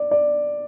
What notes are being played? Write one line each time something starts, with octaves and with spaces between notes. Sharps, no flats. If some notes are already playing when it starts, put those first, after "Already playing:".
Already playing: D5
D5